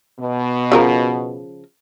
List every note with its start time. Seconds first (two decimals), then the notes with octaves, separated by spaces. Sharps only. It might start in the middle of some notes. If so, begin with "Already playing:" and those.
0.19 B2
0.72 C#3 F3 A#4